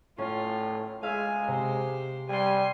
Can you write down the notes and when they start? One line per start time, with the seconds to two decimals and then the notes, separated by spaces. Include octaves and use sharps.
0.18 A2 C#4 F4
1.03 G#3 E5 F5 G#5
1.48 C3 G4 C5
2.29 G3 G#5 C6